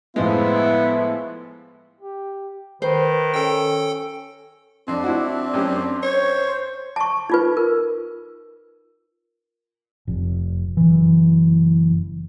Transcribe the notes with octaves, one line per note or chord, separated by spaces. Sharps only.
A2 F3 G#3 B3 E4
G4
D#3 B4 C5
C#4 A4 G5
F2 C4 D4
E4 F#4
F#2 C#4 G4
C5 C#5
A5 C#6
D#4 F4 B4
A#4
F1
F#1 E3